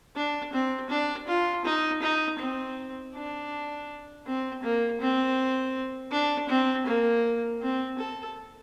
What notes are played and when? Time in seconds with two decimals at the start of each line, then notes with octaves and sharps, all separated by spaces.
0.16 D4
0.53 C4
0.90 D4
1.28 F4
1.65 D#4
2.02 D#4
2.39 C4
3.14 D4
4.26 C4
4.63 A#3
5.01 C4
6.12 D4
6.49 C4
6.86 A#3
7.61 C4
7.99 A4